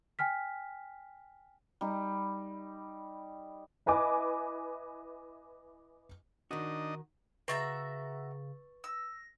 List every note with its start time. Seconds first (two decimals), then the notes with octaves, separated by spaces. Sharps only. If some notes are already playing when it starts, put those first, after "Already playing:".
0.19 G5 G#5 F6 B6
1.81 G3 D#4
3.86 E4 B4 D#5 G#5 D6
6.51 D#3 D4 D#4 F#4 D#5
7.48 C#3 F#4 B4 E5 A#5 C#6 A6
8.84 E6 A#6